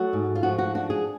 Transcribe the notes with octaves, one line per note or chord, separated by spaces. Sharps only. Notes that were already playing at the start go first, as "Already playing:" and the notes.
Already playing: F#3 A3 F#4
G#2
F4
F3 F#4
F#4
D4 F#4
G#4